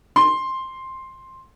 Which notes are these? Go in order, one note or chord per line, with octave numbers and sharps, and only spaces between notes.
C6